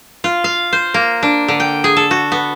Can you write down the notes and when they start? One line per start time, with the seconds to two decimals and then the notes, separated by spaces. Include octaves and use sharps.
0.24 F4
0.44 F5
0.73 C5
0.94 A#3
1.23 D4
1.48 D3
1.60 G5
1.84 G#4
1.97 A4
2.11 F#4
2.32 B3